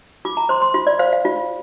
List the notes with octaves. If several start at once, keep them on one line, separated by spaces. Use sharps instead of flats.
F4 D6
A#5
C5 C6
C6
F4 C6
D5
C5 F5
F5
F4